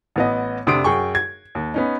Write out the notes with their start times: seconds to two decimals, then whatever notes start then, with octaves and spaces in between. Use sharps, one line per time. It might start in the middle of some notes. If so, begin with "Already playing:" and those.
0.16 A1 B3 D#5
0.67 F1 C3 D4 C6 D#6 D7
0.84 F#2 G#4 G5 C#6
1.15 G#6
1.55 D#2
1.74 B3 C#4 D#4